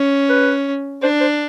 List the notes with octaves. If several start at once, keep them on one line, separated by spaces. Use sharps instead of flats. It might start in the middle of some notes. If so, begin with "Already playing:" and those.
Already playing: C#4
B4
D4 C5
C5